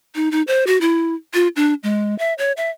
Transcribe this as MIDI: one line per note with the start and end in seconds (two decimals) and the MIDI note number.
0.15 0.31 63
0.31 0.42 63
0.47 0.64 72
0.67 0.80 66
0.81 1.14 64
1.34 1.48 65
1.56 1.74 62
1.83 2.17 56
2.19 2.34 76
2.38 2.52 73
2.57 2.70 76